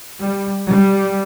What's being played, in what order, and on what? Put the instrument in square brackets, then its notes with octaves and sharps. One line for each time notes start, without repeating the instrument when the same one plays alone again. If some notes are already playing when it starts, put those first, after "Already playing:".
[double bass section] G3
G3